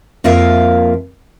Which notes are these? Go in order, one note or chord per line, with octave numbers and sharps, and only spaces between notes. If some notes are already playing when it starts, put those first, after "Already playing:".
F2 A#3 F4 A#4 E5 F5